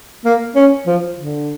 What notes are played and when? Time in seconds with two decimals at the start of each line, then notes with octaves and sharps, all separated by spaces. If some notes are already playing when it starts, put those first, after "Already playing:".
0.25 A#3
0.56 C#4
0.86 F3
1.18 D3